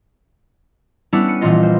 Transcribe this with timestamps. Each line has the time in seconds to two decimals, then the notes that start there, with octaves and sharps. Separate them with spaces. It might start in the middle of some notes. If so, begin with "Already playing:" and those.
1.12 G3 B3 C#4 D4 E4
1.28 C#7 D#7
1.41 A#1 A#2 E3 A#3 F4 D#5
1.63 C5